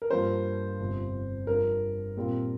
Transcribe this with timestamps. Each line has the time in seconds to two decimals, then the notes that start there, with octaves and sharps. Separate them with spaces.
0.02 A#4
0.10 G2 F3 A#3 D4 F4 C5
0.80 G1 F2 C3 F3
1.47 G2 F3 D4 F4 A#4
2.17 A#2 G3 C4 F4